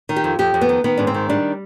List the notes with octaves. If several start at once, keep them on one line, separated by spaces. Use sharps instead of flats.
D#3
G4
F2
F2 G4
F2
B3
D#3
D#3 B3
G#2 D4
C4
D#3
G3 D4